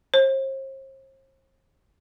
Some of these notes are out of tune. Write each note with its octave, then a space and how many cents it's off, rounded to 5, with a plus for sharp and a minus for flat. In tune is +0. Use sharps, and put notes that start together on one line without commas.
C5 +40